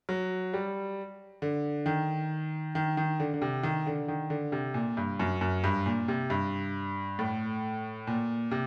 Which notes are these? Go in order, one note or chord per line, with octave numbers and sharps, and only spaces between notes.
F#3
G3
D3
D#3
D#3
D#3
D3
D3
C3
D#3
D3
D#3
D3
C3
A#2
G2
F#2
F#2
G2
A#2
C3
G2
A2
A#2
C3